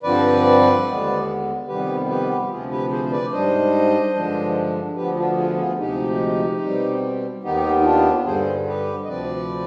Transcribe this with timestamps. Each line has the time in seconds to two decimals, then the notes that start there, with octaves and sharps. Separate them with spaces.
0.03 G2 D3 F3 C4 B4 D5
0.86 D#2 D3 G#3 B3
1.67 F2 C3 D#3 G3 B3 G4 B4
2.08 G4 B4
2.44 G4
2.49 D2 C3 F3 F4 G#4
2.71 G4 B4
2.90 G#4 C5
3.05 C5
3.11 B4 D5
3.32 G#2 G3 D4 C5 D#5
4.14 G2 D3 F3 G#3 D4
4.96 D2 D3 F3 B3 G4 B4
5.16 D4 F4
5.37 F4 G#4
5.58 F4 G#4
5.79 D2 C3 F3 G#3 D#4 G4
6.61 B2 G3 C4
7.43 D#2 D#3 B3 D#4 G4
7.81 D#4
7.84 D4 F4
8.25 G2 D3 G3 G#4 C5
8.67 G4 B4
9.04 D#5
9.07 D2 C3 F3 C4 B4 D5